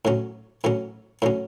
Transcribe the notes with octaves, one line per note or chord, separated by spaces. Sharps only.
A2 F#3 C#4
A2 F#3 C#4
A2 F#3 C#4